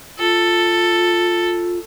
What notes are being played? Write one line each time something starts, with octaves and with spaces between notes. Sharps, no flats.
F4 A4